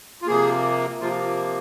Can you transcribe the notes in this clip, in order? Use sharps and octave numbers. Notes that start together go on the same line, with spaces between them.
F4
C3 F3 A#3 G#4
C3 F3 A#3 F4